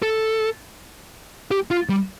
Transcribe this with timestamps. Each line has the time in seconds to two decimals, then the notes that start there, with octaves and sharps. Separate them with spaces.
0.02 A4
1.51 G4
1.71 F4
1.89 G3